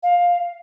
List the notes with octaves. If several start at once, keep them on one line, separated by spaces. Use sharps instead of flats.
F5